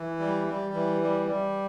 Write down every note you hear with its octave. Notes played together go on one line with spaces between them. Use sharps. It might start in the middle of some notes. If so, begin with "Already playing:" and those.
Already playing: E3
G3
G3
E3
G3
G3